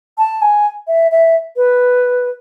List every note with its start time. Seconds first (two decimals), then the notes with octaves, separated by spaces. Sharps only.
0.18 A5
0.42 G#5
0.87 E5
1.12 E5
1.57 B4